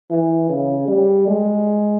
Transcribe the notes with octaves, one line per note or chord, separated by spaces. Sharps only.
E3
C#3
G3
G#3